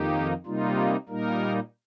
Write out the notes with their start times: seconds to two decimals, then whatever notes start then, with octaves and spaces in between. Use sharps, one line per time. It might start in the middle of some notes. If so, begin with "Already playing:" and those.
Already playing: F2 D#3 A#3 D#4 G4
0.46 C3 G3 A#3 D#4 F4
1.09 A#2 G3 A#3 D#4 A#4